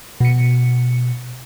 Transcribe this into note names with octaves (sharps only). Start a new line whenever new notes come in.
B2 C#7